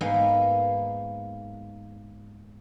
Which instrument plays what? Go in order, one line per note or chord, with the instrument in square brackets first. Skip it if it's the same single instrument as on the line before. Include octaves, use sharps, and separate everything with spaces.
[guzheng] G#2 A#3 B3 D#4 D#5